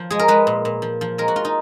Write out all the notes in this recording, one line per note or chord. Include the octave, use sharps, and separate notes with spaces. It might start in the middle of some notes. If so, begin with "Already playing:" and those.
Already playing: F3
G#3 G#4
A#4
G#3 B4
A#2
A#2
F3
F3
G#3 A#4
F#4
F4
D#4